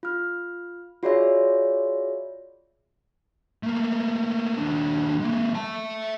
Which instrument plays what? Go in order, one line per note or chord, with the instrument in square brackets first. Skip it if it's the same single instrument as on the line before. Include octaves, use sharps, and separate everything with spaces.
[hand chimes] F4 F6
F4 F#4 G#4 C#5 D5 E5
[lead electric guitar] A3 A#3
D#2 D4
G#3 A#3
E5 A5